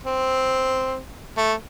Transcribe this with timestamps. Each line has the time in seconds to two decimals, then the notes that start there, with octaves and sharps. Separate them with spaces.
0.03 C4
1.37 A3